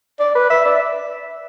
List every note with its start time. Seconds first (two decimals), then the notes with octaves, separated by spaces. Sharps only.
0.20 D5
0.35 B4
0.50 E5
0.65 D5